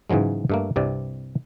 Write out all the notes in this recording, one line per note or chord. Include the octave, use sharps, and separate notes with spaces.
G#2 C#3 E3 F#3 G#3
G2 A3 A#3
C2 G2 C3 D5